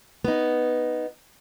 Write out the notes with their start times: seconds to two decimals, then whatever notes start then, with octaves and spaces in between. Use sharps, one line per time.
0.24 B3 D#4